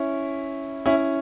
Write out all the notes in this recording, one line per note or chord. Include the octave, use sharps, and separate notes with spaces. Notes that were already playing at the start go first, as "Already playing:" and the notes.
Already playing: C#4 E4
C#4 E4